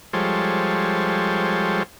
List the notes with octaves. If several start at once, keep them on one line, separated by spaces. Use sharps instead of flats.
F3 G3 G#3 A4 C5 C#5